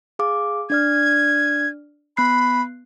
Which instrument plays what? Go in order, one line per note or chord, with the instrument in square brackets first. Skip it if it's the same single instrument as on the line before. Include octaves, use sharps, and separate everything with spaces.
[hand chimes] G#4 F5 D6
[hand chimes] D4 D5 F6 [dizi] G#6
[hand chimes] B3 F#6 C7 [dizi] B5